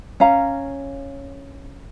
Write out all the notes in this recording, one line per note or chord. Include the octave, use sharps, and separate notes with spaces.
C#4 F5 A#5